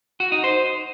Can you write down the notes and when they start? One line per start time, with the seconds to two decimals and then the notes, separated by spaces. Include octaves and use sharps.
0.20 F#4
0.32 D#4
0.44 C5